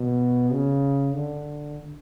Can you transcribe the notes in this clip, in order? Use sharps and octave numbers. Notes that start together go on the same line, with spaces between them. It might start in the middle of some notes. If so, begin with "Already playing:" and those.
Already playing: B2
C#3
D3